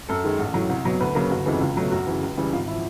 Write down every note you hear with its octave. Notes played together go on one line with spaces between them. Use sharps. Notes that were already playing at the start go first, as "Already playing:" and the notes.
F#2 A4
D#3 G#3
A1
A2 F#3
C2
B2 F#3
D2 B4
C#3 F#3 A#3
G1 F#4
F2 C#3 E3 G#3
C#2 F4
B2 F#3 A3
F#2 F#4
C#3 E3
C#2
C#3 E3 G3
G#1 F4
E4
F3